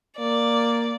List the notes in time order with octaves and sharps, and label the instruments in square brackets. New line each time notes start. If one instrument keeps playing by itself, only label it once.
[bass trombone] A#3 [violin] D5